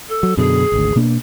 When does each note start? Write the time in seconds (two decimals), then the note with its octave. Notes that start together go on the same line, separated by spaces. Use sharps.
0.09 A4
0.23 F#3
0.37 F#2 B2 D3 G#4
0.72 G#1 D2
0.96 B2 A#3 D4